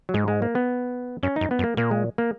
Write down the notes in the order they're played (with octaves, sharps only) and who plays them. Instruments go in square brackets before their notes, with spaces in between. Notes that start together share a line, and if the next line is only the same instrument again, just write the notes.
[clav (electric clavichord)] F#3
[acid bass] G#2 [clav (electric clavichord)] G#3
[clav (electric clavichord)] G#3
A#3
B3
[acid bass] F#2 [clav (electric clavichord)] C#4
[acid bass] F#2 [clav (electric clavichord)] D#4
[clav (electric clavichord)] B3
[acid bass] F#2
[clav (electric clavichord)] A#3
[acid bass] A#2 [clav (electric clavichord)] A#3
[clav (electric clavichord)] G#3
A#3